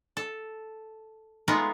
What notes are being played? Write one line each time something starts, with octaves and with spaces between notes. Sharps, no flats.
A4
G#3 A3 B3 D#4 F4